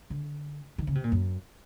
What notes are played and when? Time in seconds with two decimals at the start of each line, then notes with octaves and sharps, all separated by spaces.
0.10 D3
0.78 D#3
0.87 C#3
0.95 C3
1.04 A#2
1.12 F#2